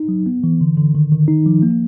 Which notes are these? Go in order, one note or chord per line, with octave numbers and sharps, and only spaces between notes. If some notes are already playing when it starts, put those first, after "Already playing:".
Already playing: D#4
F#3
B3
E3
D3
D3
D#3
D#3
D#4
F3
A#3